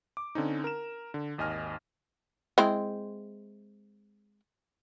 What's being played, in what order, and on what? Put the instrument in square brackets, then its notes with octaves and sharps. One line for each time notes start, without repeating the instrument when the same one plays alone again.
[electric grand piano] D6
D3 C4 C#4 D#4
A#4 E7
D3
G#1 D#2 D#5 G#5 F6
[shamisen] G#3 C4 E4